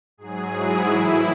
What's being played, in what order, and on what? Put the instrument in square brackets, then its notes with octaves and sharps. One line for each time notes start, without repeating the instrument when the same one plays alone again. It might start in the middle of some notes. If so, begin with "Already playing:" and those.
[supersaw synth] G#2 F#3 G#4
E4
A2 E3